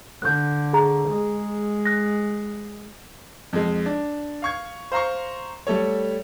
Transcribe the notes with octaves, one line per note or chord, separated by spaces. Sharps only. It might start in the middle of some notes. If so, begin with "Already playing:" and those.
D3 F#6 G6
G#4 A#5
G#3
F#6 A#6
F2 G#3
D4
F5 C#6 G#6
C5 F5 A#5 C6 C#6
G3 A3 A4 C#5